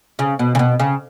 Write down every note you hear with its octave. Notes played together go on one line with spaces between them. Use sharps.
C#3
B2
C#3
B2
C#3